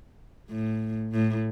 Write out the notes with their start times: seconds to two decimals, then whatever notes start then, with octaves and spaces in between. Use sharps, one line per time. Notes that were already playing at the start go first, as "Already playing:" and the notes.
0.50 A2
1.13 A2